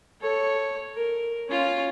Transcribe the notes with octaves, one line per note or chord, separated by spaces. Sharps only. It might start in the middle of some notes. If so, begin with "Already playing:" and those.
A4 C#5
A#4
C#4 F4